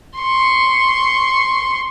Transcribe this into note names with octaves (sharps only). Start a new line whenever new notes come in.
C6 C#6